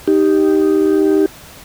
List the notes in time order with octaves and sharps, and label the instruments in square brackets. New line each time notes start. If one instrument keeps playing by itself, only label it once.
[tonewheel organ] D#4 G4